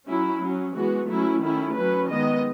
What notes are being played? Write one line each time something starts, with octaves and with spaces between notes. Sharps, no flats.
F#3 C#4 E4
F#3 C#4
E3 G#3 B3 F#4
F#3 A3 C#4 E4
D#3 A3 C#4 E4
F#3 C#4 B4
D#3 G#3 B3 D#5